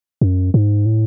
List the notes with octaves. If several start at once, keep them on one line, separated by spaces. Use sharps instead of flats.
F#2
G#2
A2